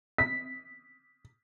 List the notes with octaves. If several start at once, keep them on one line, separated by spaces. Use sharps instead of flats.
B6